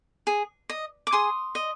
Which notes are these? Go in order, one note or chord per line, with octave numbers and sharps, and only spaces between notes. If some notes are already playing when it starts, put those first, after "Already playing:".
G#4
D#5
D6
G#4 C6 D#6
D#5